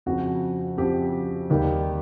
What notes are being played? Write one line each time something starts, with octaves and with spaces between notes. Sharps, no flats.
F2 C#3 F3 F#4
F2 C#3 F3 G4
D#2 D#3 G3